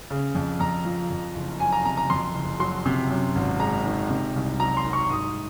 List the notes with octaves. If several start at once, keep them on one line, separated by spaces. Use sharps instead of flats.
C#3
F2
F2 A#5
F3
F2
F#1
F#3 G#5
A#5
C3 A#5
A#5
F2 C6
F#1
F#3 C6
C3
F#2
G#1
G#3 A#5
D#3
C3
C2
F#3 A#5
C6
D#3
C#6
G#2 D#6